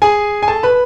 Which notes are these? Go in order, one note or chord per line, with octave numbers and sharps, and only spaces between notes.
G#4 G#5
G#5
A4 A5
B4 B5